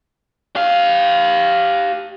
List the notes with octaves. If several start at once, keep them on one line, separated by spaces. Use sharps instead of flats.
G4 F5